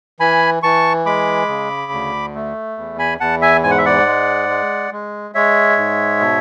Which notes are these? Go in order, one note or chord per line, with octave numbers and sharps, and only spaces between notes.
E3 G#5 B5
E3 A5 C#6
G#3 B5 D6
C#3
D2
A3
E2
G#5 B5
E2 F#5 A5
E5 G#5
G#2 G#5
F#5
E5
D5 F#5
G#3
G#3
G#3
G#3 C#5 E5
G#2
B2